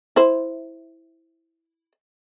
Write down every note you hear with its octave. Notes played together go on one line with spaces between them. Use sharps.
E4 C5